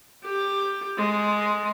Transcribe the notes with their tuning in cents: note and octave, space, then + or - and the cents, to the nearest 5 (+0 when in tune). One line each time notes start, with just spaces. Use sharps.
G4 +10
G#3 +5